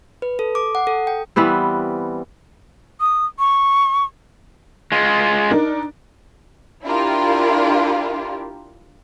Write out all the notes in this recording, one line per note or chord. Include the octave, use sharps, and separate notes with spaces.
B4
A4
D6
F#5
A4
G5
E3 G3 B3 C4
D#6
C#6
G#3 F4
D4 D#4 A#4
D4 E4 F4 G4 A#4